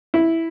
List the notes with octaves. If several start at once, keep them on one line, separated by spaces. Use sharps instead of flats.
E4